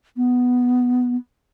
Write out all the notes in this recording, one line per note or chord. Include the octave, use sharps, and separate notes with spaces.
B3